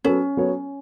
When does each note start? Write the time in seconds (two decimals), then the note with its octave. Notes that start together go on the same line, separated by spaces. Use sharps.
0.04 F#3 B3 C#4 A4 C#5
0.37 F#3 B3 A4 C#5